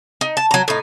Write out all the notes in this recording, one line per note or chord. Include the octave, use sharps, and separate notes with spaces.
D#4
A5
F#3 A#5
A2 D#4